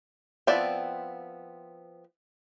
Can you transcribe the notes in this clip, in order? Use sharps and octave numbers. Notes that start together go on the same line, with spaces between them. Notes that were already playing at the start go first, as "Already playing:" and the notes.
F3 B3 C4 E4 D5